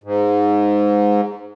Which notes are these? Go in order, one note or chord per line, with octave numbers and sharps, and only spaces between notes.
G#2